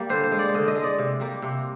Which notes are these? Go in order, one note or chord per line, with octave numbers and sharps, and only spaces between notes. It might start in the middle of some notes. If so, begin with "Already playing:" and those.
Already playing: G3 A#3
D3 C5
C5
G#3
D5
D3 D#5
D#5
G#3
D5
C3
G3 A#3
C3